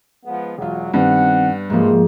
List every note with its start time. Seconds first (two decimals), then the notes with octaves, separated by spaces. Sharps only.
0.24 F3 G#3 B3
0.58 E1 F#2 F#3 F4
0.94 G2 D#3 B3 C4 D#4 F#5
1.70 G#2 C3 F3 G#3 A#3